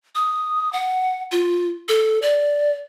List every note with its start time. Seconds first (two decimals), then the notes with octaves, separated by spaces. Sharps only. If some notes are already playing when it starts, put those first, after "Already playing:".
0.15 D#6
0.73 F#5
1.32 F4
1.89 A4
2.22 D5